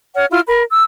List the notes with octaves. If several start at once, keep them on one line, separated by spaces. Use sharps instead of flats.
C#5 F#5 F6
E4 F4 F6
A#4 B5
E6